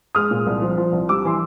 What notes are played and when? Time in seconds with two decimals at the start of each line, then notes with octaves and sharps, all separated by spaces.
0.15 G#3 D#6 F6
0.31 A#2
0.47 C2
0.62 F3
0.77 F3
0.93 C2
1.09 G3 D6 E6
1.25 E3 C6